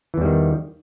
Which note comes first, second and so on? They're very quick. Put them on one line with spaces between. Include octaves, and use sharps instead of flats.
E3 E2 G3 D#3